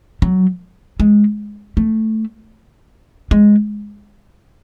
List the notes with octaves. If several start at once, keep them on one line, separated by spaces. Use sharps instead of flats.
F#3
G#3
A3
G#3